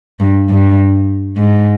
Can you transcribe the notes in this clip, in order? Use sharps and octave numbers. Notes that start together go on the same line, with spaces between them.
G2
G2
G#2